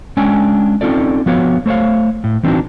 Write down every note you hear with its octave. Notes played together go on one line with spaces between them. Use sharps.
G#3 C#4 D4 G5 G#5
C4 C#4 D#4 F4 A4 D5
F3 B3 F#4 C#5 F5
A3 C5 C#5 F5
A2
E3 C4 D4 D#4 F#4